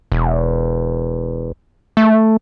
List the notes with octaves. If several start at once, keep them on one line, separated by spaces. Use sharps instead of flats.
E1
A3